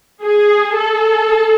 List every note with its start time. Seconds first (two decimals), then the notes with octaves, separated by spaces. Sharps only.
0.22 G#4
0.76 A4